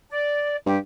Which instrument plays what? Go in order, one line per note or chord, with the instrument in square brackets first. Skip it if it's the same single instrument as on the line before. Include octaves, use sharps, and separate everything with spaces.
[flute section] D5
[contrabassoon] G2 [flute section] G4